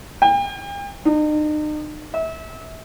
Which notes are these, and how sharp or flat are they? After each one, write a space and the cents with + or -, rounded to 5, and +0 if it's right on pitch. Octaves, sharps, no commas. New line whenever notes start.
G5 +40
D#4 -40
E5 -30